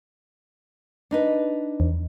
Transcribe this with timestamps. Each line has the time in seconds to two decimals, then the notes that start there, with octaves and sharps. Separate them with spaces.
1.11 D4 D#4 B4
1.80 E2